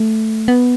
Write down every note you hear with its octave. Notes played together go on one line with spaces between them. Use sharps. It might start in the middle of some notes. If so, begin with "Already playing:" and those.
Already playing: A3
B3